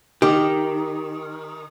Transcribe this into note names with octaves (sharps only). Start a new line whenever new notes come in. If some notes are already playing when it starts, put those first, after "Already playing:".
D#3 G4